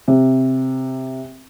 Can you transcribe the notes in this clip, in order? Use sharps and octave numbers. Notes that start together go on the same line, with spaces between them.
C3